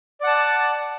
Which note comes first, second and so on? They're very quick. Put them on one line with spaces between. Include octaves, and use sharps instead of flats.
D5 F#5 A5